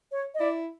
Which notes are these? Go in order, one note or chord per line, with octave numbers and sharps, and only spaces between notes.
C#5
D#5
E4 D5